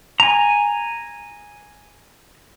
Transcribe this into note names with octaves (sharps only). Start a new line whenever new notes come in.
G#5 A#5